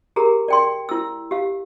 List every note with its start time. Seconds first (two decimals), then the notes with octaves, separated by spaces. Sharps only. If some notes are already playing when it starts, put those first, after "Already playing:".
0.16 G4 G#4 A#4 A#5
0.48 D5 G5 C6
0.89 E4 E6
1.31 G4 F5